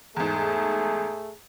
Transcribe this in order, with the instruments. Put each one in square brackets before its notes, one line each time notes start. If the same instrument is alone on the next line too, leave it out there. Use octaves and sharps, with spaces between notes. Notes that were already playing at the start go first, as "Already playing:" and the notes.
[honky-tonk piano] E2 G#2 [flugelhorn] A3 [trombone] G#4